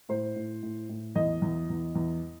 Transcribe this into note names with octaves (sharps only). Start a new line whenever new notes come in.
A2 C5
A2
A2
A2
E2 D#5
E2
E2
E2